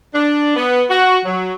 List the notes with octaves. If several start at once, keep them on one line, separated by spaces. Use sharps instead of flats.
D4
B3
F#4
F#3